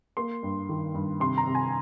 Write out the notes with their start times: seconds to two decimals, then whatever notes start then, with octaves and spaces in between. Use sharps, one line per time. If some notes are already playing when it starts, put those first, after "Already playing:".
0.17 A#3 C6
0.43 G2
0.69 D#3
0.94 G2
1.20 C3 C6
1.37 A#5
1.47 C3
1.55 G#5